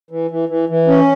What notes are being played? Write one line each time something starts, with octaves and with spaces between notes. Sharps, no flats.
E3
E3
E3
E3
C#4